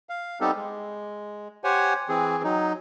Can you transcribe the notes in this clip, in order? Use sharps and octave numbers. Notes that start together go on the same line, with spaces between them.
F5
G3 B3 C4 D#4 G4 A4
G#3
G4 C5 C#5 F#5 G#5
E3 C4 G#4
F#3 D#4